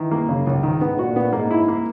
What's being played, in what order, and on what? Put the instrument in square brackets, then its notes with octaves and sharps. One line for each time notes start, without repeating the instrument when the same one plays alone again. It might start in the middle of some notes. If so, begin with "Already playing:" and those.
Already playing: [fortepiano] D#3 [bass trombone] E3
[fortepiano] A#3
[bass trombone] F#2 [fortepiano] C#3
[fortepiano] C#2
[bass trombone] G#2 [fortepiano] D#3
[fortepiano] B3
[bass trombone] A#2 [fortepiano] F#4
[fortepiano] B3
[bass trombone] G#2 [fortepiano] A#3
[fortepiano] E4
A#3